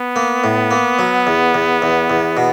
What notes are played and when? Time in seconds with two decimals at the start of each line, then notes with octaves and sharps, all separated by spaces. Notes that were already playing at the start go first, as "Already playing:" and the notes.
Already playing: B3
0.16 A#3
0.44 A2
0.71 A#3
0.99 F#3
1.27 E2
1.54 E2
1.82 E2
2.10 E2
2.37 B2